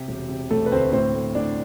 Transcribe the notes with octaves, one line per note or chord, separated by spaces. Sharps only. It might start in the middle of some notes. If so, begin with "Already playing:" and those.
Already playing: C3 G4
E1
C3
E1 A3 A4
B4
D2 C4 C5
A2 C4 C5
A3
A2 D4 D5